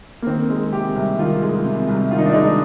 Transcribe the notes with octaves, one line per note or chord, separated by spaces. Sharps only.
A#3
D#3 C4
G#3
C3 G4
C2
D#3 F4
G#3
C3
C2
D#3 F4
D#4
D4
G#3 D#4